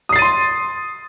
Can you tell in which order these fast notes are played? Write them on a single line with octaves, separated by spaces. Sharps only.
D#6 C7 A6 D#7 C6